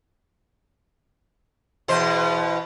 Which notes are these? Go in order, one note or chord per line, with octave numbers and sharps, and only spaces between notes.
E2 B2 C5